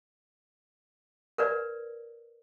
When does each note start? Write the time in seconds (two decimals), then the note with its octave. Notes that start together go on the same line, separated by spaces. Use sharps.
1.38 A#4 B4 D5